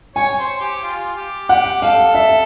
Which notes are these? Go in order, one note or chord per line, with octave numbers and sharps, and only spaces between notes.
C#5 G#5
C5
G4
F4
G4
G4 F#5
A4 F5
E5